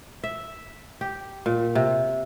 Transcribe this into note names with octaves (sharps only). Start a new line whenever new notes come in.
E5
G4
A#2
C3